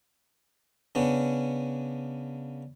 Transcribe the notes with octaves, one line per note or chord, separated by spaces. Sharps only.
C#3 B3 C#4 D4